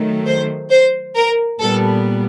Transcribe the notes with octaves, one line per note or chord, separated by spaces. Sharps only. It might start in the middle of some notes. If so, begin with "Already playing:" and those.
Already playing: D#3 F#3 A3
C5
C5
A#4
A#2 G3 B3 A4